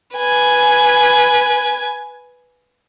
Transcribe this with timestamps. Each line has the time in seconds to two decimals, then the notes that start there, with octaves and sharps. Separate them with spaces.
0.16 B4 G#5